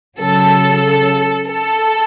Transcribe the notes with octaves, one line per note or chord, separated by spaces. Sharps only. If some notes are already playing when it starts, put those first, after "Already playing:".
C#3 F#3 A4
A4